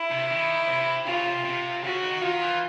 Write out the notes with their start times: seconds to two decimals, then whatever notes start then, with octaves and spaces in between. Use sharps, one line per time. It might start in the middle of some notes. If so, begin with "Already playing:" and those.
Already playing: E4
0.11 C3
0.30 D#3
0.68 C3
1.06 C#3 F4
1.26 C3
1.44 C3
1.83 C#3 F#4
2.03 D#3
2.21 D#3 F4
2.42 E3